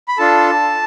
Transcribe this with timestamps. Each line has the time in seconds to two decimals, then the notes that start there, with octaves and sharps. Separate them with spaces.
0.08 B5
0.18 D4 F4 A4 A5